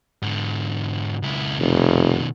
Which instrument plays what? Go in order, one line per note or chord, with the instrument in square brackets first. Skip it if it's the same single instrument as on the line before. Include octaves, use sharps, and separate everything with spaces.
[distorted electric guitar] G#2 D3
C#2 E4
[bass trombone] F1 [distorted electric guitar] B2 D#3